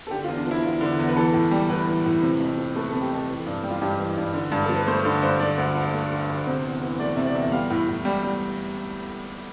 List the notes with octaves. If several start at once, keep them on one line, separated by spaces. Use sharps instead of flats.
A4
D3 G4
F4
E2
D4
F3
E4
E2 F4
D3
E2
B4
E3 A4
A2
G3
A2 B4
E3
A2
C3
F2
F3
A3 B4
C3 A4
G4
F2 A4
E3
G2
G3
F4
G2 G4
E3
G2
D3
G2
F3 A4
B4
A3 C5
D3
G2 C5
D3 D5
D2
F3
A3
D3
D2
C3 C5
E2
E3
A3 D5
C3 E5
D5
E2 E5
G3 F5
A2
A2
G3
G3